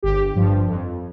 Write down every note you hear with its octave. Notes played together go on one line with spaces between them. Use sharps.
G1 G4
G2 F3
F2